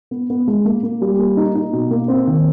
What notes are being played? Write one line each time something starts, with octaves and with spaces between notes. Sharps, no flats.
B3
B3
G#3
A#3
A#3
G3
A#3
D#4
D#4
B2
A#3
C4
D#3